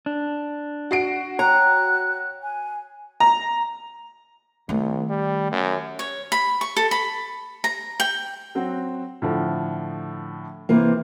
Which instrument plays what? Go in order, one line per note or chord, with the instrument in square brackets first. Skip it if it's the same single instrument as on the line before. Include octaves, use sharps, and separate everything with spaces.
[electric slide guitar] D4
[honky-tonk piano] F#4 C7 D7
[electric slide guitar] C#5 G5 [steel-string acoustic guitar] A#5 [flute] F#6
[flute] G#5
[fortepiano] A#5
[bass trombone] C2 [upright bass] D#3 A3
[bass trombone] G3
F#2
[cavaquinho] C#5
B5
C#6
A4
B5
A#5
G5
[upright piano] F#3 C4 F#4
A2 D3 F3
[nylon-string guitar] C3 E3 A#3